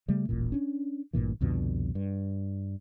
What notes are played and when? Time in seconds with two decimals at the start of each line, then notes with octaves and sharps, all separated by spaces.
0.08 C#3 G3 A3
0.29 D#1 A1 A#2
0.52 C#4 D4
1.13 A1 G2 A#2 E3
1.41 C2 F2 B2 D3
1.95 G2